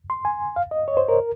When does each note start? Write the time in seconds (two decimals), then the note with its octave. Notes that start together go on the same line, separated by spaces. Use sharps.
0.10 C6
0.25 G#5
0.56 F5
0.71 D#5
0.88 C#5
0.97 C5
1.09 A#4